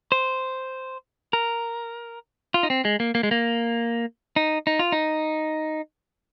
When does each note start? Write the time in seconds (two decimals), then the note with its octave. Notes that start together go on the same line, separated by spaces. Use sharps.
0.12 C5
1.33 A#4
2.54 F4
2.63 D#4
2.70 C4
2.85 G#3
3.00 A#3
3.15 A#3
3.23 G#3
3.31 A#3
4.36 D#4
4.67 D#4
4.79 F4
4.92 D#4